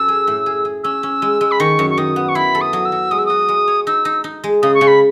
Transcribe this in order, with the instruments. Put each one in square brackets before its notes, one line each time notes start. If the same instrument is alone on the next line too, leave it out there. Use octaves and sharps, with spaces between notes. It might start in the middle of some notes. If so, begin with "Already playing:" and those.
Already playing: [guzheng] F#2 C#4 A4 [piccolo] E6
[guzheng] G#4
A2
G#4
G#4
[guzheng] C#4 [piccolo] E6
[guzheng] C#4
G#3
G#3
[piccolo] B5
[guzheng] D#3 [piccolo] C#6
[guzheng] F#2
[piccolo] C#6
[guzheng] D#3 [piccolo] D#6
[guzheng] B3
[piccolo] C#6
[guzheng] E4 [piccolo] B5
[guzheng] A4
[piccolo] D#6
[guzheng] F#3
[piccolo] E6
[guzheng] F#3
[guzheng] G#3 [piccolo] D#6
[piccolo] E6
[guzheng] F#4 [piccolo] D#6
[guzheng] G#3
C#5
[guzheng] D#4 [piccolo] E6
[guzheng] D#4
D#4
G#3
[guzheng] C#3 [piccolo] D#6
[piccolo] C#6
[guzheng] C#3
[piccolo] B5